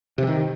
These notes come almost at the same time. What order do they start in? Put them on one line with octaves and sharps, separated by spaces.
C3 E3 D#3